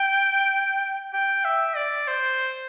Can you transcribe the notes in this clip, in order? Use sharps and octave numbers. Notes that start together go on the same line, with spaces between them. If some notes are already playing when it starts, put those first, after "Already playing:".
Already playing: G5
G5
E5
D5
C5